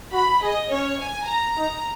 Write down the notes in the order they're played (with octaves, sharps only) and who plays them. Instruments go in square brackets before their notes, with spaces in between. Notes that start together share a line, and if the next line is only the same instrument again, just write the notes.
[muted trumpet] F#4 [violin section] B5
[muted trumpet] G#4 [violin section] D#5
[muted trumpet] C#4 [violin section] C#5
[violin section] G#5
A#5
[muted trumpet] D#4